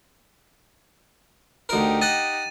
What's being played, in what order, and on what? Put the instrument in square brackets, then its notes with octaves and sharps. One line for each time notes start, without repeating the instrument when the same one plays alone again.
[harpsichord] D2 A#4 [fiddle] D#4 G4
[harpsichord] D#5 F#5 [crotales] A6 D#7